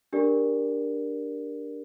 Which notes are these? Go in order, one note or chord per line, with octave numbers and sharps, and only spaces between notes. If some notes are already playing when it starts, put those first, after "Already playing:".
D4 G4 A#4 D5